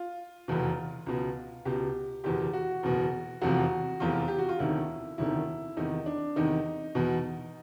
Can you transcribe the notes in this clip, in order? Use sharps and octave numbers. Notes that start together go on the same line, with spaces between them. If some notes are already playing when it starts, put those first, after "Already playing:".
Already playing: F4
F1 E2 B2
C#2 B2
C#2 B2 G4
F#1 E2 B2 G4
F#4
F#1 E2 B2
F1 E2 C3 F3 F#4
F1 E2 C3 F3 F4
G4
F#4
F4
E1 D2 C3 D#3 E4
E1 D2 C3 D#3 E4
E2 C3 D#3 D#4
D4
E2 C3 D#3 D#4
E2 B2